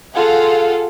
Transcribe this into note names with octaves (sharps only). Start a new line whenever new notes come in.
F4 G#4 A4 F5 F#5